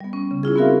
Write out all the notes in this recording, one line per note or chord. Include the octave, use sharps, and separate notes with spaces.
G3 B3
C#4
C#3
C#4 E4 F4 G#4
B3 C4 F#4 A#4 E5 F5